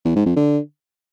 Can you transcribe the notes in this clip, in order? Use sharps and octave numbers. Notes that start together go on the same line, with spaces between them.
E2
G#2
F2
D3